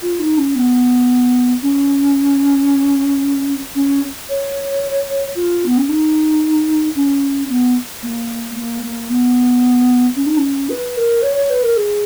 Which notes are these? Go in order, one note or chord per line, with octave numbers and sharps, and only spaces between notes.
F4
D#4
C#4
B3
C#4
C#4
C#5
F4
B3
C#4
D#4
C#4
B3
A#3
A#3
A#3
B3
C#4
D#4
C#4
B4
A#4
C#5
C#5
B4
A#4
G#4